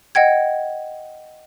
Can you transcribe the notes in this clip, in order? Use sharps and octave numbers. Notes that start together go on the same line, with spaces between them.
D#5 F#5 G5 G#6